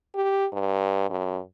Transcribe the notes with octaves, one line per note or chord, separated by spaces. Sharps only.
G4
G2
F#2